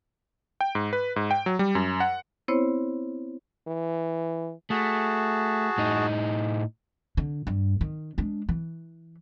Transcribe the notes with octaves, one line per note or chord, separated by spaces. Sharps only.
G5
G#2
B4
G#2
G5
F#3
G3
F#2
F#5
B3 C4 E4 C5 C#5
E3
A3 F#4 G#4 A5
A2 D#4
D3
G2
D#3
G#3 D4
E3